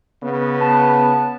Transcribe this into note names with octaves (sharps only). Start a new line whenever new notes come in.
C#3 B3
A5